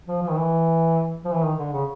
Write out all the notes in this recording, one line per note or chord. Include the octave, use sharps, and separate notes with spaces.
F3
F3
D#3
E3
F3
E3
D#3
D3
C#3